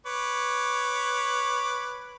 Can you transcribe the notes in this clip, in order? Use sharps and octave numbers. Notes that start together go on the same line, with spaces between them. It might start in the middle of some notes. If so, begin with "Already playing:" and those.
B4 C#5 D6